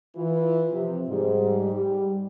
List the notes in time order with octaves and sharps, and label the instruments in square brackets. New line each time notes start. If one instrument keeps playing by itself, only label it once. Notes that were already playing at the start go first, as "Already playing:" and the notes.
[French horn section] E3 F4
C3 F3
G#2 G3
G3